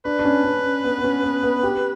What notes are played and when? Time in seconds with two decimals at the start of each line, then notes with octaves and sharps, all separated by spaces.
0.05 D4 B4
0.19 D4
0.25 C#4
0.44 C#4
0.84 B3
0.98 B3
1.04 C#4
1.24 B3
1.43 B3
1.63 G4